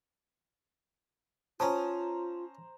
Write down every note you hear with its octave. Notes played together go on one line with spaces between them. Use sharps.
C#4 F4 C5 A5 A#5 D#6